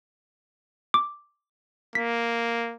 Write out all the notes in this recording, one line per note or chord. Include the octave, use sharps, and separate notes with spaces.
D6
A#3 B6